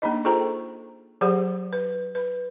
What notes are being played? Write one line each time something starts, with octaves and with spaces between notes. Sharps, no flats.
A#3 D4 D#4 D#5
F4 G#4 A4 C5 G5 A#5
F#3 G4 G#4 C5 F#5
B4
B4